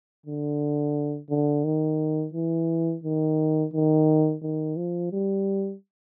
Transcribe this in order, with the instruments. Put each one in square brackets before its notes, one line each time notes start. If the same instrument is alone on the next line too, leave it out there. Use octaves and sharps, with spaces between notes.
[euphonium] D3
D3
D#3
E3
D#3
D#3
D#3
F3
G3